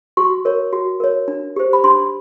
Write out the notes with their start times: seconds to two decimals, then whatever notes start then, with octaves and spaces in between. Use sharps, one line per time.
0.17 F#4 C#6
0.45 A#4 C#5
0.73 F#4
1.00 A#4 C#5
1.28 D4
1.56 G4 C5
1.73 B5
1.84 D4 C6